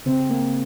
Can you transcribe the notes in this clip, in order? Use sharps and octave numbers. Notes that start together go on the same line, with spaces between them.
C#3 C4
A#3